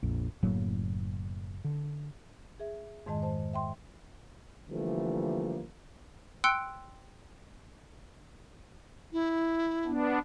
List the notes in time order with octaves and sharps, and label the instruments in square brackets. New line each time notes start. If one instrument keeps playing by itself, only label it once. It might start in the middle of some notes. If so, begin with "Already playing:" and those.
[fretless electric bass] A#1 F2
F#1 A2 F#3 A#3
D3
[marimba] G#4 E5
F2 G#2 D#3 G#3 D#5 A5
C5 A5
E5 G5 C6
[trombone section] D3 E3 F3 G3 A3 A#3
[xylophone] G5 C6 E6 F#6 C#7 D7
[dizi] E4
[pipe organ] B3 D4